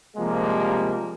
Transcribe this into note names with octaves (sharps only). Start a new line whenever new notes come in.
C3 F3 G3 G#3 A#3